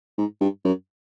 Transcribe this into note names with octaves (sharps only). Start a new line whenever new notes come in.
G#2
G2
F#2